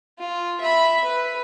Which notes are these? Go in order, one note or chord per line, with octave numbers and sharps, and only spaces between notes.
F4
E5 B5
B4